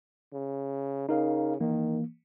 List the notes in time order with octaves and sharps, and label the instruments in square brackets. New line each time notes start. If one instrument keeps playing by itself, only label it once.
[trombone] C#3
[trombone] C#3 [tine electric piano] D#4 A#4 F5
[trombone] D#3 [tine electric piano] E3 A#3